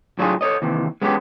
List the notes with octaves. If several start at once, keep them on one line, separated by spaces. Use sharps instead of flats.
A2 F#3 D4 F4 G4 G#4
A4 C#5 D#5
D#2 C3 E3
G#3 B3 C#4 E4 G4